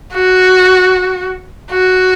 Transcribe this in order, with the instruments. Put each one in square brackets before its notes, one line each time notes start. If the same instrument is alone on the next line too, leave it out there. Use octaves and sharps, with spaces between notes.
[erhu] F#4
F#4